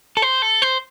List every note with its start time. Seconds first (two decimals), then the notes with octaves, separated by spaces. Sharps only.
0.17 A4
0.22 C5
0.42 A4
0.62 C5